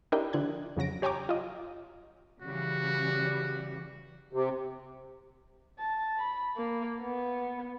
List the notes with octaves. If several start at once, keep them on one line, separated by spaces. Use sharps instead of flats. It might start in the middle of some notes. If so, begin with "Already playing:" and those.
D4 E4 G4 A#4 D#5 G5
D3 F3 F#6 G#6
F2 C#3 F#3 A#6 D7
G4 C#5 G5 G#5 A#5 D6
F4 D#5
C#3 E3 G3 F#4
C3
A5
B5
A#3
B3